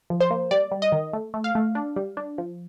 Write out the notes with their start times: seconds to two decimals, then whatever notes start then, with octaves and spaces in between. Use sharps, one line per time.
0.10 F3
0.20 C5
0.31 A#3
0.51 G3 D5
0.71 G3
0.82 D#5
0.92 D#3
1.13 A3
1.34 A3
1.44 F5
1.55 A3
1.75 D4
1.96 G3
2.17 D4
2.38 F3